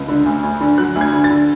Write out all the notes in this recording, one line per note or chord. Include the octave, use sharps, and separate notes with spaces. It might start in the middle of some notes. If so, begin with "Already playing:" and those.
Already playing: C#2
D3
D2
D2
D3
F#3 F#6
D2
G#6
D3
A6
D3